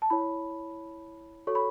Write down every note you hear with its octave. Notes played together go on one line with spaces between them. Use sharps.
A5
E4 C#5 B5
F#4 A4 C#5 C#6
B5